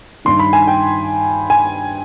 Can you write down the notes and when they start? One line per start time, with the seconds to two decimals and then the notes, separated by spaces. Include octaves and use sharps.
0.25 G2 D#3 C6
0.39 B5
0.53 G#5
0.67 G5
1.50 G#5